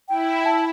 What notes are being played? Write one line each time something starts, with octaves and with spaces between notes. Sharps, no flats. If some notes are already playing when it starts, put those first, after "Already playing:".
E4 G5
A5